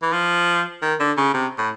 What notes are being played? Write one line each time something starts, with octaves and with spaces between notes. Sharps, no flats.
E3
F3
D#3
D3
C#3
C3
A2